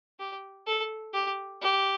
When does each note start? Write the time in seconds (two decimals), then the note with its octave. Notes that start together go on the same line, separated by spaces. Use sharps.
0.19 G4
0.67 A4
1.14 G4
1.61 G4